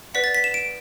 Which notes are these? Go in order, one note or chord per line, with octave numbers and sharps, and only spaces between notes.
B4 D5 F#5 B6
A6
B6
E7
D7